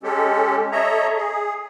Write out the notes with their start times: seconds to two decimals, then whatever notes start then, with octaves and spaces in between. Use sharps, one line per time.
0.03 G#3 C#4 G4 A4
0.72 A4 C#5 D#5 E5 A#5
1.16 G#4